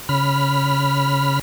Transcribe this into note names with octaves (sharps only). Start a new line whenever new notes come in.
C#3 B5 F6